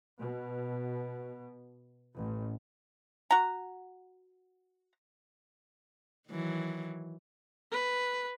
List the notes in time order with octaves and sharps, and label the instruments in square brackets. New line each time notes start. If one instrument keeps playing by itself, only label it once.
[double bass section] B2
A1
[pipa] F#4 A#5
[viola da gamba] D#3 E3 F#3
[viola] B4